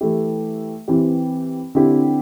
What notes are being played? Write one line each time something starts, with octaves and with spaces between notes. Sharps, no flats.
E3 A3 E4 G4
E3 C4 G4
D3 C4 E4 G4